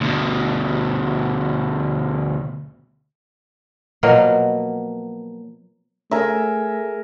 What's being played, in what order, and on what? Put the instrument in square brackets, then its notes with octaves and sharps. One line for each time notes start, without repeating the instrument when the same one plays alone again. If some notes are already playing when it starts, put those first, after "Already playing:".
[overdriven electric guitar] D2 B2
[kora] B2 F3 F#3 A#3
[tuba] A3 [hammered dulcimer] G#4 A#4 E5